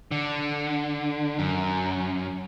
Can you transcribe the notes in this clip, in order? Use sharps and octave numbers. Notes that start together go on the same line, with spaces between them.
D3
F#2